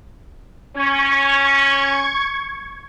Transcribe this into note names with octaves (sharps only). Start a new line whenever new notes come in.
C#4 C#6 G#6